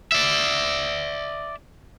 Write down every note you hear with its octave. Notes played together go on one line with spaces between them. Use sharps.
D5 E5